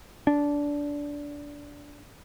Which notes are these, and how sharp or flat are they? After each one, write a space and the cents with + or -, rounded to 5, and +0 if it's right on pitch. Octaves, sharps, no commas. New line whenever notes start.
D4 -15